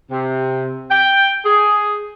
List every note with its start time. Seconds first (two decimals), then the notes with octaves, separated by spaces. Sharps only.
0.11 C3
0.91 G5
1.45 G#4